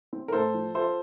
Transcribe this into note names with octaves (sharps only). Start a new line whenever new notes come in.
C4
A#4
A2 A4 C5
F3
F4 A4 C5